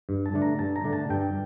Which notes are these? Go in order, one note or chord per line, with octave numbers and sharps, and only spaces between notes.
G2
A5
D3 A3 D4
A#5
G2 A5
A#5
D3 A3 D4
A5
G2 G5